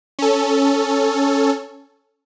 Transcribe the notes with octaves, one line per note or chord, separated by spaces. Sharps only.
C#4 A4